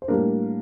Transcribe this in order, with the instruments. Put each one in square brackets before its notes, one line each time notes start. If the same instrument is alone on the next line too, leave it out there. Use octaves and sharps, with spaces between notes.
[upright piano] C5
A2 G3 A#3 D4 A#4